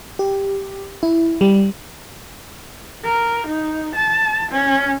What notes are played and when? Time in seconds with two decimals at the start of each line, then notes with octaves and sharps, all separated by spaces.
0.19 G4
1.03 E4
1.41 G3
3.04 A#4
3.47 D#4
3.95 A5
4.51 C#4